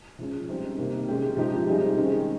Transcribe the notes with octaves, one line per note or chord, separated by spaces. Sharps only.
F3 G#3 C#4
G3 C4 D#4
C3 D#3 A#3
G#3 C#4 G4
F3 G#3 D#4 G4
G3 C4 D#4 G#4
D#3 G#3 C#4